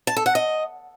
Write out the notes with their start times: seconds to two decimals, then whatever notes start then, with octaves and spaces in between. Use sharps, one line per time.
0.07 A5
0.17 A4
0.26 F#5
0.35 D#5